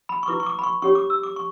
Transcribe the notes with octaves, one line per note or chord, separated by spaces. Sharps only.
B5
C#6
E4 B4 D6
C#6
D6
B5
C#6
C#4 G4 C#5 C#6
D6
E6
D6
C#6